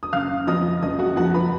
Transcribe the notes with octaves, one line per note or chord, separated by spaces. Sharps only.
D#6
F#1 F5 F6
F2 F3 D#5 D#6
F#1 D#5 D#6
F#4 F#5
F2 F3 F#4 F#5
B4 B5